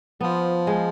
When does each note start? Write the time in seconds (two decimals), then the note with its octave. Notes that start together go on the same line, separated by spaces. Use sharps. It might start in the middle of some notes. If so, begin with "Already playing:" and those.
0.21 F3 B3
0.67 G#3